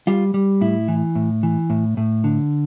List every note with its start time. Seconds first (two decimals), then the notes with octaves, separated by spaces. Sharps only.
0.07 G3 F4
0.34 G3
0.61 A2 E4
0.88 E3
1.15 A2
1.43 E3
1.70 A2
1.97 A2
2.24 D3